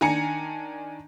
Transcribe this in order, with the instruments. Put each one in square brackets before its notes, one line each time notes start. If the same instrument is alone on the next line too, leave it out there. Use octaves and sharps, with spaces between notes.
[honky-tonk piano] D#3 D4 G#5 A#5 C#7